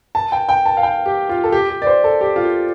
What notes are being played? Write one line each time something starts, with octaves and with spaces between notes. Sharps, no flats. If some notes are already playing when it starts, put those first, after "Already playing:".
A5
G5
G5
A5
F5
G5
G4
F4
A4
G4
G4
D5
C5
A4
G4
F4
G4